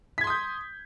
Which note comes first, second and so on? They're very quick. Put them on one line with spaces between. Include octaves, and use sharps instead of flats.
B6 G#6 C6 D#6 G6